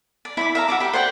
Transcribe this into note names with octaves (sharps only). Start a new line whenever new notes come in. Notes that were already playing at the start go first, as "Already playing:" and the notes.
D5
E4 B5 D6
E5 F5 A#5
F#4 E5 D6
G4 B5
C5 D5 F#5 G5